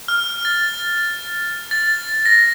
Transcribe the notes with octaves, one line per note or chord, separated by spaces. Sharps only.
F6
A6
A6
A#6